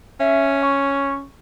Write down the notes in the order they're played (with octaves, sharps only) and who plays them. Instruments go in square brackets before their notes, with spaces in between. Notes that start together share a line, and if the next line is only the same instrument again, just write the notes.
[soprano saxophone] C#4 [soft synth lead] E5
[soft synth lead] C#6